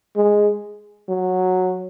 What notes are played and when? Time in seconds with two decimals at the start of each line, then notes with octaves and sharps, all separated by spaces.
0.16 G#3
1.09 F#3